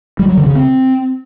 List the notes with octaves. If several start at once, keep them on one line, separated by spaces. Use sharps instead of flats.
G3
F#3
D3
C#3
C4